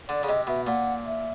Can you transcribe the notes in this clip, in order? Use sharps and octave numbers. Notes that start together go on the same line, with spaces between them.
D3 D5
C#3
C3 D#5
B2 E5
A#2 F#5
E5